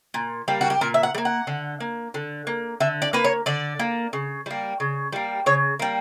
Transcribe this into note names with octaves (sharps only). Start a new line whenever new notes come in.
A#2
G3 A#3
F#4
G4
A#2 A#4
E5
F#5
G3
A#3
F#5
D3
A#3
D3
A#3
D3 E5
D5
A#3 B4
C#5
D3 D5
A#3
C#3
G3 A#3
C#3
G3 A#3
C#3 C#5
G3 A#3